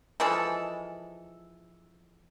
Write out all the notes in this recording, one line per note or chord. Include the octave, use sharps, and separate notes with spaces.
E3 F3 G#3 A4